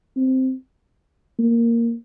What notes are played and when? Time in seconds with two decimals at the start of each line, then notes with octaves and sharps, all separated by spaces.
0.16 C4
1.39 A#3